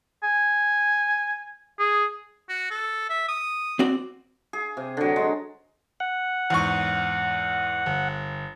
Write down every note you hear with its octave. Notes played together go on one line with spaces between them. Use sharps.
G#5
G#4
F#4
A4
E5
D#6
C4 F#4 D5
G#4
C3
D3 F#3
G#3
F#5
E2 G#2 C#6
G1